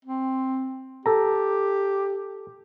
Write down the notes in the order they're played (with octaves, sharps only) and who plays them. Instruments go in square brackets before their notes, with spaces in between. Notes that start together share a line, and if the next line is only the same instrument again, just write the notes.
[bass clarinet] C4
[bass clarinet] G4 [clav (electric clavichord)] A4 A#5